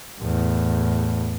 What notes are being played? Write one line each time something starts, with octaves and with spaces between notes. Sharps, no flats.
E2 A2